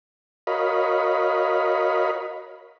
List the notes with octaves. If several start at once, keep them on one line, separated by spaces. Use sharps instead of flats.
F#4 A#4 C#5 D#5 F5 B5